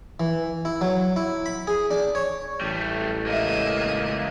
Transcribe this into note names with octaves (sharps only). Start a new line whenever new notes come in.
E3
E4
F#3
E4
B5
G#4
D4
C#5
A1 G3 A3
C#2 A#3 D#5 E5